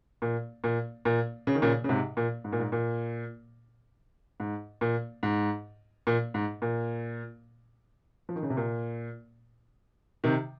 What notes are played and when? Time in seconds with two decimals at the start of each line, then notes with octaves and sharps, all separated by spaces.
0.22 A#2
0.64 A#2
1.05 A#2
1.47 C#3
1.55 D#3
1.62 A#2 C#3
1.84 C#3
1.89 G#2 C3
2.17 A#2
2.44 G#2
2.52 A#2
2.60 G#2
2.72 A#2
4.40 G#2
4.81 A#2
5.23 G#2
6.07 A#2
6.34 G#2
6.62 A#2
8.29 F3
8.36 D#3
8.43 C#3
8.50 C3
8.57 A#2
10.24 C3 D#3